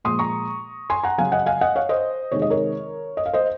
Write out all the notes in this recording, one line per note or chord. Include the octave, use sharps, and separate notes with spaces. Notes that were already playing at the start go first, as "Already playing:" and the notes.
A#2 F3 G#3 C6 D#6
A#5 C#6
G#5 C6
F#5 A#5
C#3 F#3 F5 G#5
D#5 F#5
F5 G#5
D#5 F#5
C#5 F5
C5 D#5
C3 D#3 G#3 C#5
D#5
A#4 C#5
D#5
F5
C5 D#5